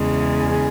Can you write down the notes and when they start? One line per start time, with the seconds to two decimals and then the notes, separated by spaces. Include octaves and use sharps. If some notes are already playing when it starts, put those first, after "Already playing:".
Already playing: E2 C#3 G#3
0.39 G#4